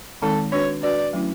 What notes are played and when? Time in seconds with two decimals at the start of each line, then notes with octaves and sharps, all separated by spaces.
0.22 D#3 G#3 C4 D#4 A4
0.52 D4 F#4 B4 C#5
0.83 D4 F#4 B4 D5
1.13 F#3 A3 C#4 E4